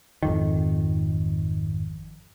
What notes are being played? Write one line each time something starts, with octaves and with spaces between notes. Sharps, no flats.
G#1 F2 D#3